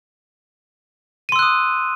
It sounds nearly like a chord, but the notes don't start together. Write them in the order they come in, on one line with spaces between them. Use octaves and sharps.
D#7 C6 E6 F#6 D#6